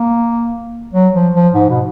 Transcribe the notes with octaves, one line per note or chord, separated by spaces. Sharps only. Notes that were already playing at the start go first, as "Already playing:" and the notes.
Already playing: A#3
F#3
F3
F3
G#2
B2